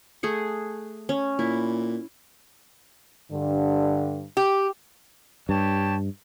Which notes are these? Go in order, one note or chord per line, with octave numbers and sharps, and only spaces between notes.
A3 G#4 F#5
C#4
A#2 E4
G2 D3
G4
G2 G4 C#5 A5